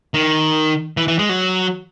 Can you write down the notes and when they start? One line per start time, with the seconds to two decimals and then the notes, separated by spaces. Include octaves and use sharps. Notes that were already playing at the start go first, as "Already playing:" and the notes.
0.14 D#3
0.97 E3
1.08 E3
1.19 G#3
1.29 F#3